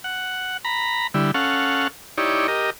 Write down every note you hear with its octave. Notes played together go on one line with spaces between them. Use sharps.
F#5
A#5 B5
D3 G3 E4
C#4 A4 F5 F#5
D#4 E4 G4 C#5 D5
G4 A#4 D#5